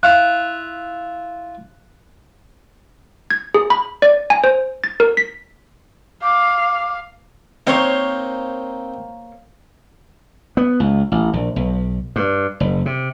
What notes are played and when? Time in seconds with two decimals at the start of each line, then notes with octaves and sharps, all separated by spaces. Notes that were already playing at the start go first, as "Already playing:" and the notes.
0.03 E4 F4 F5 F#6
3.30 G#6
3.54 G#4
3.70 B5
4.02 D5
4.30 G#5
4.44 C5
4.84 A6
5.00 A#4
5.17 B6
6.23 F5 D6
7.67 A#3 C4 D#4 C5 C#5
10.57 B3
10.80 C#2
11.12 A1
11.33 A#1
11.56 B1
12.16 G2
12.60 F#1
12.86 C3